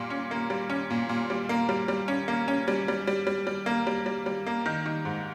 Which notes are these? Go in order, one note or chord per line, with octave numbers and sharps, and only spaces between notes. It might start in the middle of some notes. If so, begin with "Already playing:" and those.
Already playing: A#2 G3
C#4
A#3
G3
C#4
A#2
A#2
G3
A#3
G3
G3
C#4
A#3
C#4
G3
G3
G3
G3
G3
A#3
G3
G3
G3
A#3
D#3
D#3
G#2